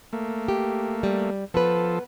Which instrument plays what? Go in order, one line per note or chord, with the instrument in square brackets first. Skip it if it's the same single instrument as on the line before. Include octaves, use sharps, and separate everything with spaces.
[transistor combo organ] A3 A#3
[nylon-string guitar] G4
G3
[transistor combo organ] F3 A4 [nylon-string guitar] B3 B4